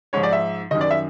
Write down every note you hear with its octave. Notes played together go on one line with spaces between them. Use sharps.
G#2 F3 C#5
D5
E5
F#2 D#3 D#5
D5
E5